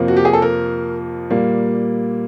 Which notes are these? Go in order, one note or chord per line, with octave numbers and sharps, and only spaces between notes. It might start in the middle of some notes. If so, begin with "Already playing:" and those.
Already playing: F2 C3 F3 A#3
F#4
G4
G#4
A4
A#4
A#2 G3 A#3